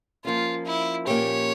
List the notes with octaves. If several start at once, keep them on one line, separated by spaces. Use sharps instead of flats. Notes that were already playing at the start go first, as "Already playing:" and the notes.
F3 A#3 C#4 F4
E4
A#2 F3 A#3 C#4 G4 C#5